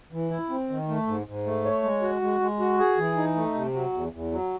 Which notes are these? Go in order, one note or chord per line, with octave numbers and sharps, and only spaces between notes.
E3
E4
C4
D#3
A3
G#2
G#2
A3
C#5
G#3
F#4
G#3
G#3
F#4
G#4
E3
D#4
A3
C3
F#3
E2
E2
F#3